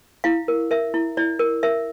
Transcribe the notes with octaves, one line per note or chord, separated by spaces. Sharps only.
E4 F5
A#4
A#4 E5
E4
E4 D5
A#4
A#4 E5